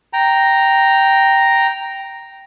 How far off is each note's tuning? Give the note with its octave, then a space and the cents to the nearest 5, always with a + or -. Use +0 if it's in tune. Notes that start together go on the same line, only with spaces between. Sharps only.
G5 -5 A#5 +0